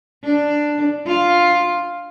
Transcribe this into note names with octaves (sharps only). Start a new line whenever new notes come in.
D4
F4